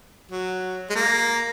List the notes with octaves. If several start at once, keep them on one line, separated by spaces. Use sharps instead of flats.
F#3
G#3
A#3